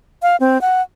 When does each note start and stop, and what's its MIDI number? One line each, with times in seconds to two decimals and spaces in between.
0.22 0.36 77
0.40 0.60 60
0.61 0.82 78